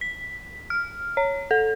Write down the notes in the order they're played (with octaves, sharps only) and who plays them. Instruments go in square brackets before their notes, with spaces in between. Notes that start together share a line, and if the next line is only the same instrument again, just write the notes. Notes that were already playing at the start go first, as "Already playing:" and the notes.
[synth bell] B6
F6
C#5
A4